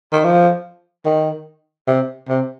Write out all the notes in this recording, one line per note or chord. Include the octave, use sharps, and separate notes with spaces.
D#3
F3
D#3
C3
C3